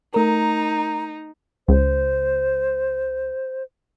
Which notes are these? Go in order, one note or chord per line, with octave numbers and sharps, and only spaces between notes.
A3 D#4 A#4 A#5
C#2 C5